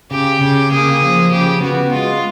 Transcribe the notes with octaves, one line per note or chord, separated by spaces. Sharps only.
C#3 G4
C#3
A#3 G#4
F3
C#3 G4
B3 F#4
G#3 F4